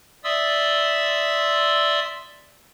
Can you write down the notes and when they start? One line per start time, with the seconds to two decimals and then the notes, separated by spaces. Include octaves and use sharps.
0.24 D5 E5 C6 D#6 E6